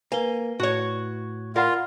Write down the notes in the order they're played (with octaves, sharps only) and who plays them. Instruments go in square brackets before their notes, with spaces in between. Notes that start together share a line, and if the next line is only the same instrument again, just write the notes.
[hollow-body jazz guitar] A#3 [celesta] B4 G7 [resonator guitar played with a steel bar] G#5
[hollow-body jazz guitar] A2 [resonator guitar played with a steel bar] F#4 C#5
[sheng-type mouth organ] F4 [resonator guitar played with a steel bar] A#4 F5 [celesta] D5 F#5 B5